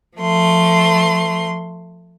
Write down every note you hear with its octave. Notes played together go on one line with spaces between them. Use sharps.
F3 A3 C6